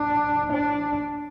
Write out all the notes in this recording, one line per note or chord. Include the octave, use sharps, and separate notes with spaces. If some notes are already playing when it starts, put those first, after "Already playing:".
Already playing: D4
D4